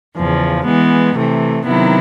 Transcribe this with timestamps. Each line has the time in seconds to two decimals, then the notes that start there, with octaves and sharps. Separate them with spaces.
0.16 E2 C#3 F3
0.65 E3 G#3 B3
1.15 C3 E3 A3
1.65 C3 D#3 F#3 B3 E4